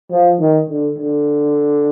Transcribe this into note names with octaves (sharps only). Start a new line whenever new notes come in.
F3
D#3
D3
D3